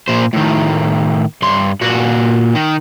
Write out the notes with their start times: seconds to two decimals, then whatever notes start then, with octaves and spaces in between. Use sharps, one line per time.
0.08 A#2 C5
0.33 A2 D#3
1.42 G2 C6
1.81 A#2 F#4
2.55 D#3